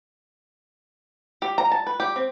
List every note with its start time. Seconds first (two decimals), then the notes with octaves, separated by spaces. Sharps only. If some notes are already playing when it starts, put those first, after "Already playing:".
1.42 G4
1.58 A#5
1.72 A5
1.87 B4
2.00 G4
2.16 C4